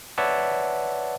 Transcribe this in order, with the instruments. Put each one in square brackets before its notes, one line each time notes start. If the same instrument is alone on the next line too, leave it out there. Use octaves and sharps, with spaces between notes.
[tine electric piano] B4 C#5 D5 E5 F#5 A5